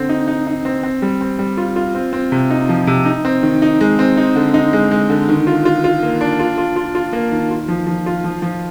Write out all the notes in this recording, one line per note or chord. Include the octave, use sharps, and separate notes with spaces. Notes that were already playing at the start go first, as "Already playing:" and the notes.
Already playing: D3 C4
D#4
D#4
D#4
C4
C4
G3
C4
G3
F4
F4
C4
C4
C3
D#4
F3
C3
D#4
C4
D#3
D#4
G#3
C4
D#4
D3
D#4
G#3
G#3
D3
D#3
F4
F4
F4
A#3
D4
F4
F4
F4
F4
A#3
D#3
F4
F3
F3
F4
F3
F3